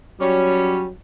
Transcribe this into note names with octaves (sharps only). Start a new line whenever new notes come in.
F#3 G3 C#4